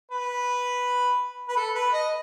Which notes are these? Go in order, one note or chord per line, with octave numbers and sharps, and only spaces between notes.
B4
B4
A4
B4
D#5